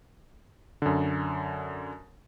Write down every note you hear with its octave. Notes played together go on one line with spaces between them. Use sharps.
F#2 D3